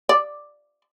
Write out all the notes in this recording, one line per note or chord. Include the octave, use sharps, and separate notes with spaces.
D5